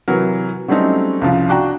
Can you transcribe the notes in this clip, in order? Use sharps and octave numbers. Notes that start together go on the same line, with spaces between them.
C3 E3 F#3 A#4
F#3 G3 A3 C4 C#4 D#4
C2 C#3 F3 F4
D4 F#4 G5 A#5